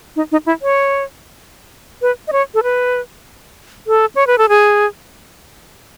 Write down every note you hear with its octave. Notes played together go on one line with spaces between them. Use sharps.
D#4
D#4
E4
C#5
B4
D#5
C#5
A4
B4
A4
C#5
B4
A4
G#4